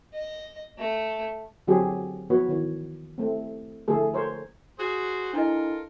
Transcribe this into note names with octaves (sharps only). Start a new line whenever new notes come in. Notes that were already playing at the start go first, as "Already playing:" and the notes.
D#5
A3
D3 F#3 C4 G4 G#4 C#5
F3 B3 F#4 B4 C#5
D#3 E3 C#5
A3 C4
D3 F3 A3 G#4 A4
A#4 C5 C#5
F#4 G#4 C5
D4 E4 F4 A4 A#4 D#5